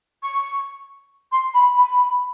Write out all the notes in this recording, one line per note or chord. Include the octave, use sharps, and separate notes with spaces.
C#6
C6
B5
B5